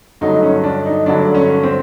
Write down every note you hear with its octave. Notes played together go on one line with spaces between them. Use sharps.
G2 D3 F#3 A3 D#4
C#4
D4
D#4
G2 D3 F#3 A3 D4
C#4
C4